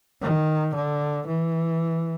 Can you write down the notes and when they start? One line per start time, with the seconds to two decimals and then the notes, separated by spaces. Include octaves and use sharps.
0.22 D#3
0.75 D3
1.27 E3